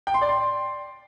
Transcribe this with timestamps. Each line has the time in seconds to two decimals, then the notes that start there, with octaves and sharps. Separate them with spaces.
0.07 G5
0.14 C6
0.22 D5
0.29 C6